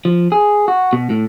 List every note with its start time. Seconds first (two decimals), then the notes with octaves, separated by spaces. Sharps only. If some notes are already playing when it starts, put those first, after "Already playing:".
0.05 F3
0.32 G#4
0.68 F#4
0.93 B2
1.10 A2